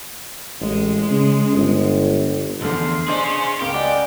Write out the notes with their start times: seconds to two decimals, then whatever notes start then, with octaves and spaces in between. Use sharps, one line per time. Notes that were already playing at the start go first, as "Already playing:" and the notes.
0.61 A1 G#3
1.11 C#3
1.53 G1
2.61 B1 E2 D3 F3 A3 C6
3.08 C#4 D4 G#4 C5 D#5
3.61 C#2 C#3 G4 A#4 F5
3.74 D5 D#5 F#5 G#5